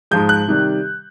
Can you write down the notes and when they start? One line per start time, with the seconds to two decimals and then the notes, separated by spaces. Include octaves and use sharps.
0.11 G#2 F3 G#3 G6
0.29 F#6
0.48 C3 D#3 G3